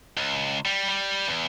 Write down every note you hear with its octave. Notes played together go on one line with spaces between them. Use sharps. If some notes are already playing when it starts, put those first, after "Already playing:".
C#2
G3
G3
E2